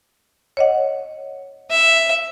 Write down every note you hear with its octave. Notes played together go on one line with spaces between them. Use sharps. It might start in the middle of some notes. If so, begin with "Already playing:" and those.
C#5 D#5 F#5
E5